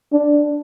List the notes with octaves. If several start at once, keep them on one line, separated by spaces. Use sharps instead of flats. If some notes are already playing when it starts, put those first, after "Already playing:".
D4